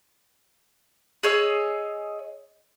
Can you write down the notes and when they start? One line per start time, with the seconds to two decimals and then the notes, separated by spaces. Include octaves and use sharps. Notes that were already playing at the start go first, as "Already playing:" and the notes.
1.23 G#4 C#5 D#5 E6